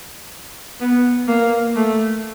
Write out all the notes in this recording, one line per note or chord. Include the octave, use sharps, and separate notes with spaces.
B3
A#3
A3